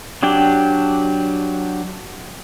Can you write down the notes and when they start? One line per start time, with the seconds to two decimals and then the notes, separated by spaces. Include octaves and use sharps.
0.23 F#3 D4 G4 G5